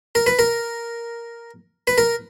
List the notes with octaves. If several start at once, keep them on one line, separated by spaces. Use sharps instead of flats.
A#4
B4
A#4
B4
A#4